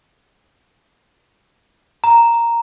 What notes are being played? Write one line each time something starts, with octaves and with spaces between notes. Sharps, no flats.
A#5